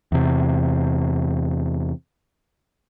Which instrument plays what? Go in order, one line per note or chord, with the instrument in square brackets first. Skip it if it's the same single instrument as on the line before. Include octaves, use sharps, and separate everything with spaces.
[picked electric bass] E2 C3